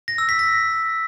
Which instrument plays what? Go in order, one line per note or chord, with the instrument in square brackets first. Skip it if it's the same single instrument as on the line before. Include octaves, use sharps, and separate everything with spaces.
[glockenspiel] A#6
E6
B6
A#6